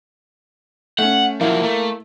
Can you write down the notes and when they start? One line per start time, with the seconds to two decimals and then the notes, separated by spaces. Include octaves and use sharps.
0.98 A3 C#4 F#5
1.41 F3 F#3 A#3 E4
1.64 A3